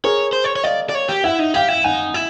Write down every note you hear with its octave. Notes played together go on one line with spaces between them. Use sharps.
G#4 A#4 C#5
C5
C#5
C#5
D5 D#5 F5
D5
C#5
G4
E4 E5 F#5
D#4
G4 F5 G5
E4
D#4 F#5 G#5
E4